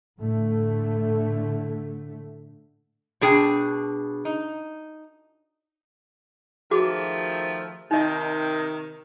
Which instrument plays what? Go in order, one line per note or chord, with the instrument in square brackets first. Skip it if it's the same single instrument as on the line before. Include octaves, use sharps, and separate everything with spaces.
[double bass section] A2 D3 A3
[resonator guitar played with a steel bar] B2 D4 G#4 G5
D#4
[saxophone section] D#3 F3 A3 [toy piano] F#4 G#4 D6
[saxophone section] C3 D#3 [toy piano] D#4 D#5